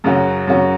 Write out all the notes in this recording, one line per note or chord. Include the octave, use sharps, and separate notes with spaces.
F#2 C#3 F#3 C#4 F#4
F#2 C#3 F#3 C#4 F#4